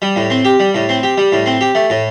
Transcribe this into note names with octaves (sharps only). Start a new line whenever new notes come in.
G3
A2
C4
G4
G3
A2
C4
G4
G3
A2
C4
G4
A3
A2